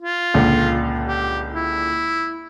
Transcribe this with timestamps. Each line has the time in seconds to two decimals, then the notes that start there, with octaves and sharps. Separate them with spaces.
0.02 F4
0.34 C#2 A#2 D3
1.08 G4
1.56 E4